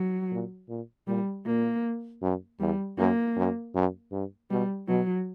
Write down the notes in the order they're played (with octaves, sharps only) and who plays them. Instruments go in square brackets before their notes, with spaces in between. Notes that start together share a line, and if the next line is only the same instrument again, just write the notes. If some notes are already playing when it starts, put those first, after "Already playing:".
Already playing: [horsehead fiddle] F#3
[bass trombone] A#2
A#2
[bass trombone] A#2 [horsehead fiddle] G3
[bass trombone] A#2 [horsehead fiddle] A#3
[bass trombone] F#2
[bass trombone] E2 [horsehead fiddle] G3
[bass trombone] F#2 [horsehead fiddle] A#3
[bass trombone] F#2
F#2
G2
[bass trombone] B2 [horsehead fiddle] G3
[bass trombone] B2 [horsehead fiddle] F#3